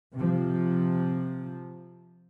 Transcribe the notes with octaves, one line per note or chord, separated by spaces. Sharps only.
C3 F3